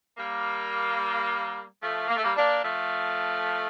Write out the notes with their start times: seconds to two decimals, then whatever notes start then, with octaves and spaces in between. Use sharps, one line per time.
0.18 G3 A#3
1.81 F3 A3
2.08 A#3
2.16 A3
2.23 G3 A#3
2.35 A#3 D4
2.63 F3 A3